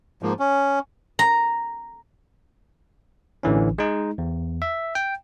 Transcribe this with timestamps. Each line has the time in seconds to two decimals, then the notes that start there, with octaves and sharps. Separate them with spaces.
0.23 G#2 F3 A#3
0.39 C#4
1.19 A#5
3.43 A1 D3 E3 C#4
3.78 G#3 D#4
4.18 E2
4.62 E5
4.95 G5